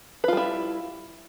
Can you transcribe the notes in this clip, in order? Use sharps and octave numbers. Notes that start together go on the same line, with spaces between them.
G3 E4 F4 B4